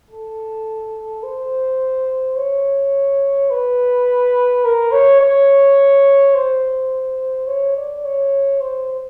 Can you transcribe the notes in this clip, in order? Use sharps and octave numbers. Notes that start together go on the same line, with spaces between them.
A4
C5
C#5
B4
A#4
C#5
C#5
C5
C#5
D5
C#5
C5